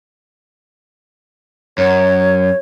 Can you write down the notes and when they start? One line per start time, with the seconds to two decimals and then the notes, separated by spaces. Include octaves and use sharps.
1.78 F#2 C#5